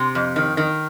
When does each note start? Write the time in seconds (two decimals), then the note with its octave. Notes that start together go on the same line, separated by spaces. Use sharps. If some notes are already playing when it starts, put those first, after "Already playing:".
Already playing: C3
0.15 F2
0.36 D#3
0.57 D#3